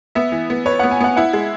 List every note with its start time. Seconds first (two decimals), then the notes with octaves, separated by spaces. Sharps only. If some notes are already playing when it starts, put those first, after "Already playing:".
0.15 B3 E5
0.32 E3
0.50 B3
0.66 B4 C#5
0.79 F#5
0.83 B3
0.91 G#5
1.00 B3 F#5
1.16 E4 F#5
1.33 G#3